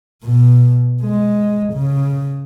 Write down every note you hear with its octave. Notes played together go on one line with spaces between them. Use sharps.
B2
G#3
C#3